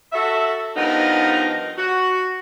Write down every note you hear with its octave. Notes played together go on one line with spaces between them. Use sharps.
F#4 A4 E5
G2 F3 B3 D#4 A#4
F#4